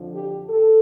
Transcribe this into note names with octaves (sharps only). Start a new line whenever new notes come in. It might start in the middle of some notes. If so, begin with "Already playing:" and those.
Already playing: F2 D3 F3
G4
A4